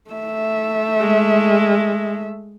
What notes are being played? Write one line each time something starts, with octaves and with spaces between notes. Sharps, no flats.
A3 E5
G#3